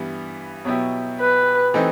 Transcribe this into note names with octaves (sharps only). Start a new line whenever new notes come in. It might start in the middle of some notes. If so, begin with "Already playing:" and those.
Already playing: G2 E3 G3 B3
B2 F#3 B3 E4 G4
B4
E3 A3 C4 D#4 G4